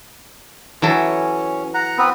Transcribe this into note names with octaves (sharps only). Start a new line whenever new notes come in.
E3 F#3 C#4 A4
F#5 A#5
B3 C4 B4